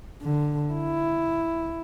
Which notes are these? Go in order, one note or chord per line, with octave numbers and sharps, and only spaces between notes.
D3
E4